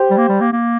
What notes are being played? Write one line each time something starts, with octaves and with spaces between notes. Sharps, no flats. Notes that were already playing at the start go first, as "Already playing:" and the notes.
Already playing: G4 C5
G3
A#3
G3
A#3
A#3